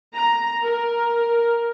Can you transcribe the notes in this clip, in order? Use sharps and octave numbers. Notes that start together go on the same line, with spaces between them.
A#5
A#4